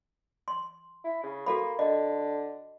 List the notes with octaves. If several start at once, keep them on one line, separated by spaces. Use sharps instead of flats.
C6
E4
C#3
A#3 F#4 A4 B5
D3 D#5